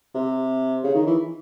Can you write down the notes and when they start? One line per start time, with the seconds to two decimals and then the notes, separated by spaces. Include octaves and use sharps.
0.15 C3
0.83 C#3
0.95 D#3
1.06 E3